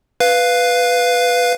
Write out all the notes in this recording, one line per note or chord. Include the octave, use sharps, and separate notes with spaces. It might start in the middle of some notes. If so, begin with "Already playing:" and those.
B4 F5